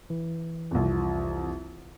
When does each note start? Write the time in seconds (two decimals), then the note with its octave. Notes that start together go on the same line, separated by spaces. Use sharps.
0.10 E3
0.71 C2 F2